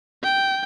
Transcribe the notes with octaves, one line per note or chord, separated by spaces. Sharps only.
G5